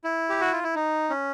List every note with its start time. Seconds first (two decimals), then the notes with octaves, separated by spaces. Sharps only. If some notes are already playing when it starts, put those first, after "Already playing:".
0.04 E4
0.29 G4
0.41 F#4
0.52 F4
0.63 E4
0.75 D#4
1.10 C#4